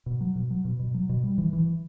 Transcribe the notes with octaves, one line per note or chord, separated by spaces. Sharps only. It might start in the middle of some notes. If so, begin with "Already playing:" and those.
B2
F#3
B2
F#3
B2
B2
F#3
B2
G3
E3
E3